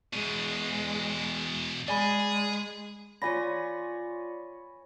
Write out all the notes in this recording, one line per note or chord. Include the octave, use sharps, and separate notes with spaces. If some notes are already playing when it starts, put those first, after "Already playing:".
E2 B2 G#3
G#3 G#4 D5 G#5 B5
F4 C#5 D5 G#5 B5 A#6